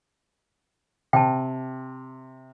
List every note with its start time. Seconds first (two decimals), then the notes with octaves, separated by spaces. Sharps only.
1.13 C3 G5 A5